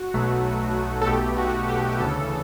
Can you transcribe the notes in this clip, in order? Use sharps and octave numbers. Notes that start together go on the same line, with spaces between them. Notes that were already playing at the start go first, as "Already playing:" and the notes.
Already playing: F#4
B1 B2 F#3 A3
A4
B1 B2 A3 G4
F#4
G4
G4
D2 C#3 E3 A4